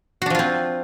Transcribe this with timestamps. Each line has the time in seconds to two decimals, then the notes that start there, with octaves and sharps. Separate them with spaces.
0.22 F#4
0.26 D4
0.30 F3
0.35 F4
0.39 C4